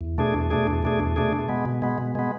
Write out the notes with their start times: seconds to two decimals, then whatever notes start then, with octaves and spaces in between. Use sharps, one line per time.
0.01 E2
0.18 B2 A3 D4 G#4
0.34 E2
0.50 B2 A3 D4 G#4
0.67 E2
0.83 B2 A3 D4 G#4
1.00 E2
1.16 B2 A3 D4 G#4
1.33 B2
1.48 G#3 B3
1.65 B2
1.82 G#3 B3
1.98 B2
2.15 G#3 B3